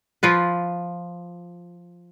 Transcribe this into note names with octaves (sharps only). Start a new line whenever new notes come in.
F3 F4 B4